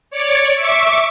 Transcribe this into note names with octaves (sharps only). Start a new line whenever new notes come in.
C#5 D5 C#6 D6
E5 C#6 D6